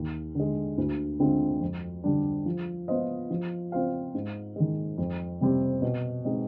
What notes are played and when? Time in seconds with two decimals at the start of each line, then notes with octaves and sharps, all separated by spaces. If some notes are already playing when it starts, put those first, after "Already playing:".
Already playing: D#2
0.35 D3 G#3
0.78 D2
1.20 D3 G#3 C4 F4
1.61 F2
2.04 D3 G3 D4
2.46 F3
2.88 B3 F4 C5 D#5
3.31 F3
3.72 C4 F4 C5 F5
4.14 G#2
4.56 D#3 G#3
4.98 F2
5.41 C3 G3 C4 G4
5.82 B2
6.25 G#3 C4 D#4